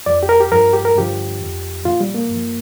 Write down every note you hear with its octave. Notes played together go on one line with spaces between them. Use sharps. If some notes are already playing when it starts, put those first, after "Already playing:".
F2 F3 D5
G4
A#4
G4
G2 F3 A#4
G4
A#4
G2 D3 F3 G4
F2 F3
A#2 F3 F4
G3
A#3
G2 F3